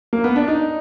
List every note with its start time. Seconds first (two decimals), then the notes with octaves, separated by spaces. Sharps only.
0.13 A#3
0.24 B3
0.36 D4
0.48 D#4